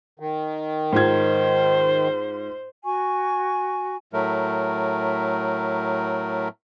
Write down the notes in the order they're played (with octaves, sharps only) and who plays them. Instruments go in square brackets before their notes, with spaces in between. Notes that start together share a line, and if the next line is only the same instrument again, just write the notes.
[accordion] D#3
[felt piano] G#2 F4 G#6 [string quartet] C5
[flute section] F#4 G#5 C#6
[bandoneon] A2 F#3 A3 A#4